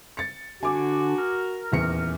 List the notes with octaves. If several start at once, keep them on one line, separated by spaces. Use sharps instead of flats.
A6 C#7
D3 F#4 G#5 D6
A#4
D#1 E2 C#7